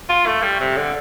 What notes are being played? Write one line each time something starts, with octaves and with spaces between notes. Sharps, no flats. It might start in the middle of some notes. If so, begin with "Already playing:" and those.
F4
A3
G3
C3
D3